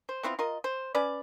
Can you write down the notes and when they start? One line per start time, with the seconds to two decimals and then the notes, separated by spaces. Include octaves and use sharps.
0.09 C5
0.23 B3 C4 E4 F4
0.39 F4 A#4 D#5
0.64 C5
0.95 C#4 B4 D5